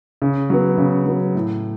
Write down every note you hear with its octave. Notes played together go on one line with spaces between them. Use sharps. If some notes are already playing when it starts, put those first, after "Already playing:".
C#3
F#3 B3
C#3
F#3 B3
A2